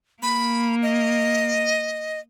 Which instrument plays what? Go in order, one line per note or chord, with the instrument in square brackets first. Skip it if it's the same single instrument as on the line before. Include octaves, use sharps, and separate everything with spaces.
[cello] A#3 [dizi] B5
[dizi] D#5